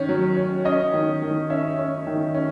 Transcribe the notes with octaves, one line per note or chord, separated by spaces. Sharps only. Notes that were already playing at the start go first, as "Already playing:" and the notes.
Already playing: D#3 C#4
F#3
C#4
C#4 D#5
D#3
D#3
C#4 E5
C#4
D#3
C#4